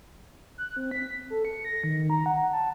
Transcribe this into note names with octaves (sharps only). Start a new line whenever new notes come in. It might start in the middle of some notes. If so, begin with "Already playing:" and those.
F#6
C4
B6
A4
C#7
A#6
D#3
A#5
F#5
A5